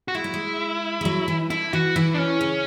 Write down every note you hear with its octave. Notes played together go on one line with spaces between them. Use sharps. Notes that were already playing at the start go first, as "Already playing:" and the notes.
F#4
G#3 E4
F#3
G#3
G#3
F#3
E3
D3 E4
E3 F#4
E3 E4
D4
C#4
C#3